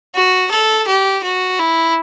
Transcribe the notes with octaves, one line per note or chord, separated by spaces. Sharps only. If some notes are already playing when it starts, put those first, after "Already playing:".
F#4
A4
G4
F#4
E4